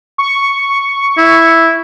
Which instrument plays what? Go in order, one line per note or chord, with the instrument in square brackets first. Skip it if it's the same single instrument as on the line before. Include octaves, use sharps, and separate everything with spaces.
[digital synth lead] C#6
[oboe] E4